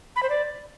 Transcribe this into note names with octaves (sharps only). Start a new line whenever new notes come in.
B5
C5
D5